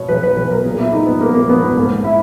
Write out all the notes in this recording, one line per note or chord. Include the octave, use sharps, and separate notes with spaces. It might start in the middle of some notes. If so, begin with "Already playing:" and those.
Already playing: B2 C#5
B1 B4
B4
B1 B4
A#4
A#2 G#4
E4
A#2 D#4
B3
A#1 A#3
A#3
A#1 B3
B3
G#2 A#3
E4